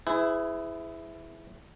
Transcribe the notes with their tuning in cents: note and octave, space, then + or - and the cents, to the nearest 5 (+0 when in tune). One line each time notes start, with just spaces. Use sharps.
E4 +0 G#4 +0 B4 +40